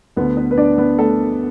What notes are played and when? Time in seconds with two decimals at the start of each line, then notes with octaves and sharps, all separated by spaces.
0.16 D2 D3 B3 B4
0.37 B3 B4
0.51 B4
0.58 D4 D5
0.78 B3 B4
0.99 A3 A4